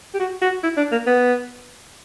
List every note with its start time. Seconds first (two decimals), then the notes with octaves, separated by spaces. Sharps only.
0.14 G4
0.19 F#4
0.42 F#4
0.63 E4
0.77 D4
0.92 A#3
1.06 B3